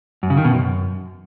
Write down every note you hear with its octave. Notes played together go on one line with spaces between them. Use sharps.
F#2
C#3
D#3
B2
F#2